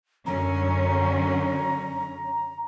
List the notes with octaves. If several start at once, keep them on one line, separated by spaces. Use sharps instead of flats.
F#2 D3 C#4 A#5